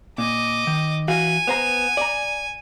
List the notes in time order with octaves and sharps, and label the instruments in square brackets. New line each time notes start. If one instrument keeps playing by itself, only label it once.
[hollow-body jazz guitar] A#2 [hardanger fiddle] D#5 D6
[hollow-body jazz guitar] D#3
[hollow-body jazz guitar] E3 F#4 F5 [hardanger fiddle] G#5
[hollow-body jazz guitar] B3 C5 A#5
D5 A#5